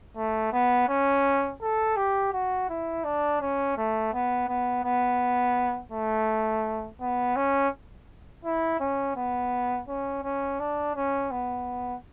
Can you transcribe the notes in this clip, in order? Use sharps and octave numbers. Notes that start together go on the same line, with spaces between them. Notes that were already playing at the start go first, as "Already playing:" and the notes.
A3
B3
C#4
A4
G4
F#4
E4
D4
C#4
A3
B3
B3
B3
A3
B3
C#4
E4
C#4
B3
C#4
C#4
D4
C#4
B3